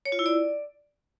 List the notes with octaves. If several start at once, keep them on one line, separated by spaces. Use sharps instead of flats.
C#5
F4
E4
D5